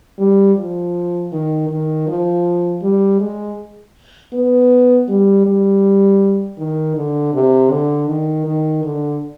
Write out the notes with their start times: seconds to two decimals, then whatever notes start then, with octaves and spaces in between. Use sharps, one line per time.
0.19 G3
0.57 F3
1.32 D#3
1.70 D#3
2.08 F3
2.82 G3
3.20 G#3
4.33 B3
5.08 G3
5.46 G3
6.58 D#3
6.97 D3
7.34 C3
7.71 D3
8.08 D#3
8.46 D#3
8.84 D3